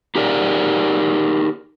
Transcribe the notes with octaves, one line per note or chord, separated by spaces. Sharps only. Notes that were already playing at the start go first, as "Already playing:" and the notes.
D#4 G4 G#4 A#4 D5